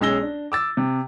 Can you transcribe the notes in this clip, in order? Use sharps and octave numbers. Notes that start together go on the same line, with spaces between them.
B1 G#3 C#4 E6 A#6 G7
D4
D6 E6 A6
C3